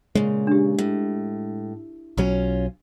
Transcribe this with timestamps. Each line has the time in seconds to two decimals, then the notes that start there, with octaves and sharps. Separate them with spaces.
0.15 A#2 C#3 G#3
0.47 D4 G4
0.78 A2
2.18 B1 F#3 C#4 F4